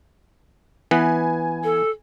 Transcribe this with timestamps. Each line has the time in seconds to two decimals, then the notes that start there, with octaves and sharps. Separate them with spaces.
0.91 E3 B3 B4 G#5
1.64 A4